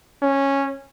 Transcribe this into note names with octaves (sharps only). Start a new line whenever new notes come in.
C#4